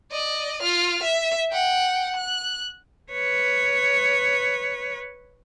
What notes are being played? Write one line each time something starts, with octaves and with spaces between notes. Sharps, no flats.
D5 D#5
F4 F6
E5
F#5 G5
F#6
B4 C#5